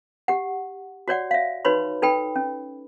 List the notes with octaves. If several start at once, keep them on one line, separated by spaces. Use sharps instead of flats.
G4 F#5
F#4 C#5 D5 F#5
E5 F5
D#4 F#4 B4 C#5 B5 C6
D#4 A4 B4 G5 B5
C#4